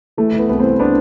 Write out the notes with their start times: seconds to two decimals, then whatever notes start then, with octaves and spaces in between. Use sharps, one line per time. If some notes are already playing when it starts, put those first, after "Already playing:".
0.17 E3 A3
0.34 E3
0.39 B3
0.49 C2 B3
0.59 E3 A3 C4
0.79 B3 D4